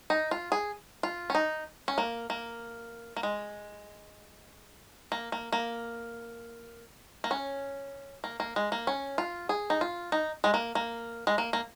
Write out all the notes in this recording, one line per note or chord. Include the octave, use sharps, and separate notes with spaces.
D#4
F4
G#4
F4
C#4
D#4
C#4
A#3
A#3
A#3
G#3
A#3
A#3
A#3
A#3
C#4
A#3
A#3
G#3
A#3
C#4
F4
G#4
D#4
F4
D#4
G#3
A#3
A#3
G#3
A#3
A#3